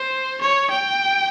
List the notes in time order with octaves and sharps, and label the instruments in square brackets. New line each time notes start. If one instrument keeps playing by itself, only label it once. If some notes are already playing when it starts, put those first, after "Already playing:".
Already playing: [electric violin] C5
C#5
G5